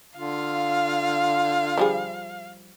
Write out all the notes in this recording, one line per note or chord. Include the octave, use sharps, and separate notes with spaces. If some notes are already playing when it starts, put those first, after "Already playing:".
D3 F4 F5
F3 G3 G#4